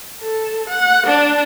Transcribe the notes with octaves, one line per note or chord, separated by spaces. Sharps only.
A4
F#5
D4